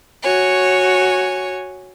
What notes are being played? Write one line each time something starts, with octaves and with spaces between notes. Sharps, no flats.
F#4 C#5 G#5